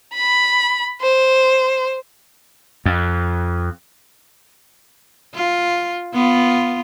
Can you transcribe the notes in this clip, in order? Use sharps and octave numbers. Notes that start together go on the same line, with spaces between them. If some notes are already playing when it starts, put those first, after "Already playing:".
B5
C5
F2
F4
B3 F4